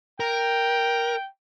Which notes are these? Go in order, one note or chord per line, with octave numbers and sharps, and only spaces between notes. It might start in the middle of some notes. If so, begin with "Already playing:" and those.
A#4 G5